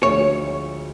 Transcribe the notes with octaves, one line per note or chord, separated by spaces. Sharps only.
D2 D3 F3 G#3 C#5